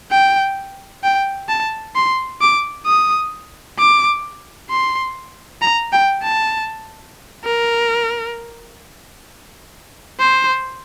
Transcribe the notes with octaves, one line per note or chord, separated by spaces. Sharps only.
G5
G5
A5
C6
D6
D#6
D6
C6
A#5
G5
A5
A#4
C5